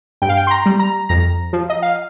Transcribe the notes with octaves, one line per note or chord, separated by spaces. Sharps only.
G2 G5
F5
G5
C6
A#5
G3
A#5
F2 A#5
F3
D#5
F5